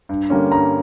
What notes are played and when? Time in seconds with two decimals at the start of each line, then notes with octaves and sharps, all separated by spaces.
0.09 G2
0.30 D3 G3 A#3 C#4
0.52 G2 A#5